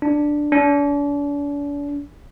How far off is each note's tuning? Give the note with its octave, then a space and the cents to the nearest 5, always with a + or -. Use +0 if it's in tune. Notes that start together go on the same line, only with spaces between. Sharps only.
D4 +5
D4 -40